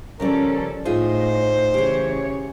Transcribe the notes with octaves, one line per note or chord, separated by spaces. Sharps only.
C#3 F3 G3 C#4 A4 A#4 D5
A2 D#4 F4 G#4 C5
C#3 E3 G4 G#4 C#5